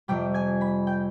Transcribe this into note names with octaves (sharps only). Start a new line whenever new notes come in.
F2 C3 G3 G5 G6
G#5 G#6
B5 B6
G5 G6